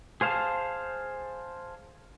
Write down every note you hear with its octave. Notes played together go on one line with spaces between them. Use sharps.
G#4 C5 F5 A5